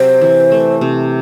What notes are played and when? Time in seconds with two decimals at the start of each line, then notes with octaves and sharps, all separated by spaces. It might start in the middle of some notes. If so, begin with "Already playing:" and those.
Already playing: C3 F#3 C5
0.21 E3
0.52 A3
0.81 C3